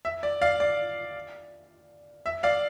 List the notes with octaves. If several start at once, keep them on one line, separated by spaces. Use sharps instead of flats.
E5
D5
D5 F5
D5
E5
D5 F5